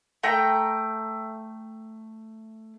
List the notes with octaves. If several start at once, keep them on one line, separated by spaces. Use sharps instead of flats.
A3 G5 A#5